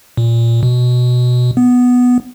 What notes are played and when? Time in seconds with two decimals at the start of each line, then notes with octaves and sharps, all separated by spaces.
0.17 A#2
0.63 B2
1.57 B3